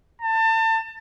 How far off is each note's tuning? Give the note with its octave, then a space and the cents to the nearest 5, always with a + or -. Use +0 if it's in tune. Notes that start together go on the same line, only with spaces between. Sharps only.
A5 +30